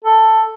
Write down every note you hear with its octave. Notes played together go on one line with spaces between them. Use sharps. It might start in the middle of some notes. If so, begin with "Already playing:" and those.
A4